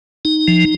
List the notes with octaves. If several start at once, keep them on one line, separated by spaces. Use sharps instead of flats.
D#4
F3